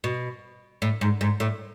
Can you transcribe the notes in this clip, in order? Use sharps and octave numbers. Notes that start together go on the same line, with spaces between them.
B2
A2
G#2
G#2
A2